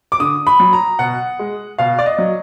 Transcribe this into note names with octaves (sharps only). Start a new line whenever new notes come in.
D6
D3 D#6
B5
F#3
A#5
B2 F#5
G#3
B2 F5
D5
D#5
F#3